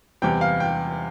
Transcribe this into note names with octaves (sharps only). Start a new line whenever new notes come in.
E2 C3 G3 G5
F5
G5